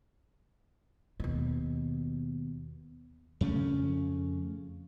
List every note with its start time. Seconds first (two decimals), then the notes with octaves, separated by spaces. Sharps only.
1.20 D#2 B2
3.41 F2 C#3 A3 C#4